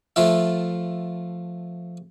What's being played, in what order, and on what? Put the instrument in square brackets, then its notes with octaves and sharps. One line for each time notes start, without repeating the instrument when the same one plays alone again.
[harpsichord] F3 A3 F4 E5